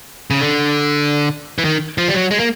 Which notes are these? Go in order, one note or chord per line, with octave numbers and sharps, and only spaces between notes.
C#3
D3
E3
D#3
F3
G3
F#3
G#3
A#3